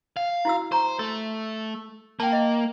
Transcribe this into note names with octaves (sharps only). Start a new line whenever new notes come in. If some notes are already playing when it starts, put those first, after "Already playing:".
F5
E4 F#4 E6
C5 A#5 C#6
A3
A#3 G5 A5
D#5